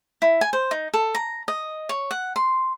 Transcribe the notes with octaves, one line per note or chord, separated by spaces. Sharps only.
E4
G#5
C5
D#4
A4
A#5
D#5
C#5
F#5
C6